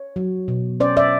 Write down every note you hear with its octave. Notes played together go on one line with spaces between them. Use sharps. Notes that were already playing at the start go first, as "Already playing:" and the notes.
Already playing: C#5
F#3
B2
C#4 C5 D5
D5 E5